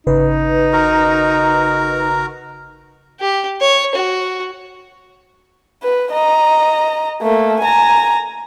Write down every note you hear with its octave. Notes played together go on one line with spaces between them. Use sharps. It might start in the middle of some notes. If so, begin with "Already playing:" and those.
G#1 C#3 D#4 B4
F#4 A#4 A#5
G4
C#5
F#4
B4
D#5 A#5
A3 A#3
G#5 A#5